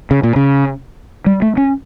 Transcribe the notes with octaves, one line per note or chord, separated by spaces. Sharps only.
C#3
A#2
C#3
G3
A3
C#4